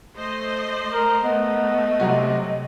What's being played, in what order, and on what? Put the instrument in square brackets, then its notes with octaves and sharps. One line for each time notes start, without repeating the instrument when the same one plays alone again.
[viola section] A3 C5 D#5
[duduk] A#4
[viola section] A3 [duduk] B3 [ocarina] D#5
[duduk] C3 [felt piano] F#3 G3 F#4